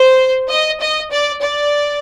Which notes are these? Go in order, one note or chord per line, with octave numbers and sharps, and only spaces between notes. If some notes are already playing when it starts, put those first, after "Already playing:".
Already playing: C5
D#5
D#5
D5
D5